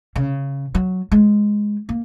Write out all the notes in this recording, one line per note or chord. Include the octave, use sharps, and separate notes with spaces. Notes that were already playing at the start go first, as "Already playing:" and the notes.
C#3
F#3
G#3
A#3